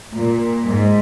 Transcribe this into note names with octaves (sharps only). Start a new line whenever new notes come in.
A#2
G#2